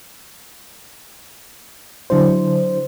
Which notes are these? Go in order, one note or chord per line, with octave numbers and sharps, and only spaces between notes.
D3 F#3 D4 E4 C5